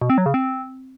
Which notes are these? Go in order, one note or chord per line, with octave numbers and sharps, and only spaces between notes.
B2
C4
F#3
C#3
C4